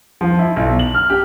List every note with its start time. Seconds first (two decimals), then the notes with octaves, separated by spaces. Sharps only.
0.21 F3
0.39 E4
0.56 B1
0.79 F#7
0.94 F6
1.10 G4